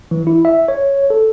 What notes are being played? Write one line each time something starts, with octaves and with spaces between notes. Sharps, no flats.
E3
E4
E5
C#5
A4